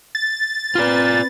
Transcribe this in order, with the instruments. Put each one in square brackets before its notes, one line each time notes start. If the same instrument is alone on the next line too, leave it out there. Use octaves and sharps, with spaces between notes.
[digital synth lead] A6
[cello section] C4 B4 [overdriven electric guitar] F4 D5